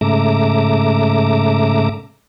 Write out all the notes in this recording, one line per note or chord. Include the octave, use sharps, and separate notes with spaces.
G#2 C#3 A3 E5 A#5 D6